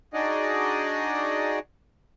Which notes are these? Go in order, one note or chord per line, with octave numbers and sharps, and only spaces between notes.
D4 D#4 F#4 G#4 D5 D#5